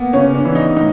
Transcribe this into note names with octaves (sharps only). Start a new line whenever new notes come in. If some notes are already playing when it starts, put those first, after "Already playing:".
Already playing: A#3 B3
C#3 C#4
D4
E3
D#4
A2 D#4